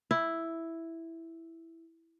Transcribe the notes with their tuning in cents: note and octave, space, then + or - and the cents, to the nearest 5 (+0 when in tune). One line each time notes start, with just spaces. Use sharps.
E4 +0